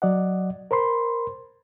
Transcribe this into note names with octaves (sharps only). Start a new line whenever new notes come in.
F#3 D5 D#5 F#5
A#4 C5 B5 C6